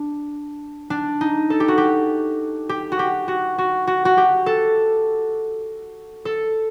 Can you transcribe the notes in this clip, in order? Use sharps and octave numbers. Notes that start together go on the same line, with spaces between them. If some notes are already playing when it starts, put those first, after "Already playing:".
Already playing: D4
D4
D#4
A4
G4
F#4
G4
G4
F#4
G4
F#4
F#4
F#4
F#4
G4
A4
A4